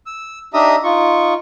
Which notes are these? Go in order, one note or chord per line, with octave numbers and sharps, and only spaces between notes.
E6
D4 D#4 G4 E5 A#5 D#6
D#4 F4 C#6